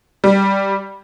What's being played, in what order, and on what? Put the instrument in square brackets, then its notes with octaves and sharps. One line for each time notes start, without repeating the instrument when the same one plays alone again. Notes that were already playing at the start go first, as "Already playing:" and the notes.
[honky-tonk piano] G3